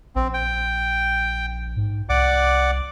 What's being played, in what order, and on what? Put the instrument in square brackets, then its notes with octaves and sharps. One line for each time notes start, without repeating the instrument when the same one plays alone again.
[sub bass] A#1 [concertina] C4
[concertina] G5
[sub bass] G#2
[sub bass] C2 [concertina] D5 F#5 D6